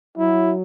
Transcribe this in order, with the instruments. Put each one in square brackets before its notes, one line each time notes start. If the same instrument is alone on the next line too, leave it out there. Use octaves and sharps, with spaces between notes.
[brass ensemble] F#3 [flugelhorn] E4